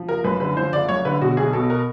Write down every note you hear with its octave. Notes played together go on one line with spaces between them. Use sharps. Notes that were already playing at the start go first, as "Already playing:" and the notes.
Already playing: F3
F#1 A#4
F#2 B4
D3 B4
F3 C5
F#1 D5
F#2 C#5
D3 B4
B2 F#4
B1 G#4
B2 A4
A#4